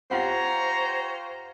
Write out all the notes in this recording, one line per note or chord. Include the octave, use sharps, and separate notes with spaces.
F4 G4 C5 C#5 F#5 A#5